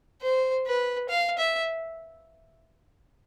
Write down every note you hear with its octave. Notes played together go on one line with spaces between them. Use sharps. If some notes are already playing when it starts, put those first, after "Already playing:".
C5
B4
F5
E5